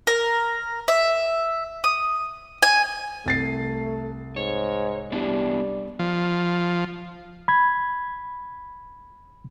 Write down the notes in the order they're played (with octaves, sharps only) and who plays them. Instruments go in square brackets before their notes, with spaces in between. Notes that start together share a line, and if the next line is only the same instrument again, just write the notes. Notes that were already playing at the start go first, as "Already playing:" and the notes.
[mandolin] A#4
E5
D#6
G#5
[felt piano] C2 A6 C7 [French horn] A3
[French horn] G#2 [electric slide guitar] C#5
[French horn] G3 [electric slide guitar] B3 D4 E4
[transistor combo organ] F3
[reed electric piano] B5 G#6